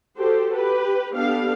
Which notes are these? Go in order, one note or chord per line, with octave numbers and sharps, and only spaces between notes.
F#4 G4 A4 C5
G4 B4
B3 D4 G4 A4 F5